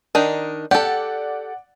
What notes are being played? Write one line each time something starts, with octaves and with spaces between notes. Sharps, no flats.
D#3 D4 D#4
G4 A4 D5 F#5